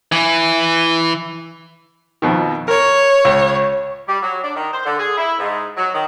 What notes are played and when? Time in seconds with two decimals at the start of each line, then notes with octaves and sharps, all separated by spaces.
0.12 E3
2.22 F2 B2 D#3
2.68 A#4 C#5
3.25 C#2
4.08 G3
4.22 F#3
4.43 D4
4.55 D#3
4.72 C5
4.85 D3
4.99 G#4
5.17 E4
5.39 G#2
5.76 F#3
5.94 D#3